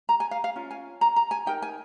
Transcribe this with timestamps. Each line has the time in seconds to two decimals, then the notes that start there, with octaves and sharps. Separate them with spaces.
0.09 A#5
0.20 G#5
0.31 F5
0.44 F5
0.56 C#4 F4
0.71 G#5
1.01 A#5
1.16 A#5
1.31 G#5
1.46 D#4 A#4 G5
1.62 G#5